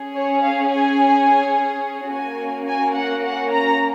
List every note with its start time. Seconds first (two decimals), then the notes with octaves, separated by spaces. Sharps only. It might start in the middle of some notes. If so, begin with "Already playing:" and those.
Already playing: C#4 G#4
0.15 C#5
0.42 F5
0.70 G#5
2.11 A#3 C#4 F#4 G#5
2.67 G#5
2.96 F#5
3.23 F#5
3.51 A#5